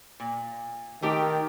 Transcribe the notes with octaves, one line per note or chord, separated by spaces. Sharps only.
A#2
D#3 A3 G4 G5